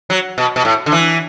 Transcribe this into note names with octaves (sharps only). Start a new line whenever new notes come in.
F#3
B2
B2
A2
D3
E3